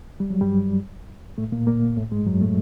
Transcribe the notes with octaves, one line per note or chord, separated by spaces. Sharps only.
G3
F#3
G2 G3
A2 A3
A#2 A#3
A#2 A#3
A2 A3
G#2 G#3
F#2 F#3
A2 A3